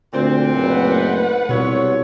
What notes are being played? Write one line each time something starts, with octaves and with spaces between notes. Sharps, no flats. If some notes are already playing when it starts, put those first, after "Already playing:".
D2 A#2 C4
F#1 A3 B4 F#5
C2 B2 F4 A4 C#5